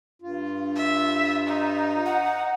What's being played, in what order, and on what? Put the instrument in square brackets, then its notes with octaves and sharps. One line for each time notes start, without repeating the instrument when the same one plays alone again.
[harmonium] G2 F4
[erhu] E5
D#4
[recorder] F#5